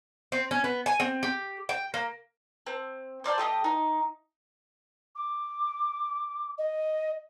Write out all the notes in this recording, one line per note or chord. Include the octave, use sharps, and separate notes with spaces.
C4
C#4
B3
G#5
C4
G4
G5
A#3
C4
C5 D5 F5 A5
A3 G4 D#5
D#4
D6
D#5